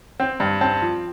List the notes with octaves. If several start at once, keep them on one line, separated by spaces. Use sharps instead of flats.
C4 G5
G2
C4 A5
F3